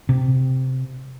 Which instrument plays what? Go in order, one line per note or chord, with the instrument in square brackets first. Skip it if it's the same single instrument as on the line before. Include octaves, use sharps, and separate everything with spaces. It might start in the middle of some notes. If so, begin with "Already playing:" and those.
[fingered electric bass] C3